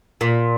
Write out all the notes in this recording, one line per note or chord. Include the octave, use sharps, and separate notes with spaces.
A#2